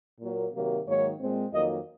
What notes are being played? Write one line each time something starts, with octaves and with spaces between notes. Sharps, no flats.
A#2 F#3 A#3
C3 D#3 F#3 A#3
G#2 D#3 F#3 A#3 C#5
A#2 G#3 C4
F2 D#3 F#3 A#3 D#5